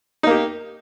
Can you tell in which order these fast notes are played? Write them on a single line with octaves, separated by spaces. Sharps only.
D#4 A#3 G4